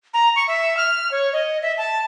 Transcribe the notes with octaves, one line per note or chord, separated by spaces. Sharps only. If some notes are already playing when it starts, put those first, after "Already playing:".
A#5
C#6
E5
F6
C#5
D#5
E5
A5